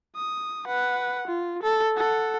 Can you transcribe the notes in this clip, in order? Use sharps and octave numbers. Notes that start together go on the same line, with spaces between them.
D#6
B4 F#5
F4
A4
A4 F#5